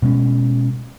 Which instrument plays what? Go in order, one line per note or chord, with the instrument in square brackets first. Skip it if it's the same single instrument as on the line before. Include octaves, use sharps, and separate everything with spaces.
[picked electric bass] B2 G#3 C#4